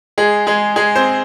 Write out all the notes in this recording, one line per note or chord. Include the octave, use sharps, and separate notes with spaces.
G#3 G#4
G#3 G#4
G#3 G#4
C4 C5